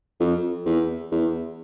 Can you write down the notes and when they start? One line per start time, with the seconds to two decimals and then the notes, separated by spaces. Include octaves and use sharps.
0.20 F2
0.65 E2
1.12 E2